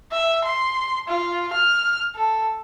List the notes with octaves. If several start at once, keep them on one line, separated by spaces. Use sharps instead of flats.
E5
C6
F4
F6
A4